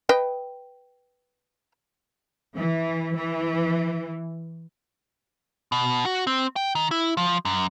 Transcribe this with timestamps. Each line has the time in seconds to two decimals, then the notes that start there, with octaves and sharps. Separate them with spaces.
0.09 B4 D#5 G5
2.56 E3
3.16 E3
5.72 B2
6.05 F#4
6.27 C4
6.56 G5
6.75 D#3
6.91 E4
7.17 F3
7.45 F#2